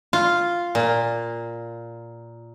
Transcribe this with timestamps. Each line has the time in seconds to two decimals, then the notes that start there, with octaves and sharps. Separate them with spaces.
0.13 F4
0.75 A#2